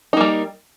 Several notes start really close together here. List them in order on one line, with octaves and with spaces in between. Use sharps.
D#4 A#3 G3